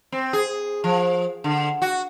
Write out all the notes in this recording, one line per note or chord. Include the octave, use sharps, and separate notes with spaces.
C4
G#4
F3
D3
F#4